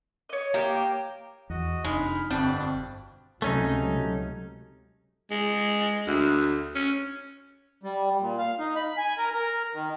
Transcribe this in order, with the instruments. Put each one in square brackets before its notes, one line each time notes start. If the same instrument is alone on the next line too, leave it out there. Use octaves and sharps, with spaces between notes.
[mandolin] C#5 D#5
[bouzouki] A#3 G4
[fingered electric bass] E2 [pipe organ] F#4 D#5
[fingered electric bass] F1 F2 D4 [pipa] G#3 [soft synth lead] D#4 [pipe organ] B5 F6
[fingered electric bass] G1 [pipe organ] F2 B2 [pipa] G3 D4 [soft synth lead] C4
[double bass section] C#2 C3 F#3 [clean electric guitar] A3 C#4 D#4
[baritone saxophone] G#3
D2
C#4
[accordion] G3
A#2
F5
D#4
B5
G#5
A#4
A#4
D#3